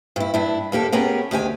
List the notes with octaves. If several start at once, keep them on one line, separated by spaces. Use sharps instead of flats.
G2 E4
G2 D4 E4
D#2 A#3 G4 A4
B3 C#4 G4 G#4 A#4
D2 D#3 G4 G#5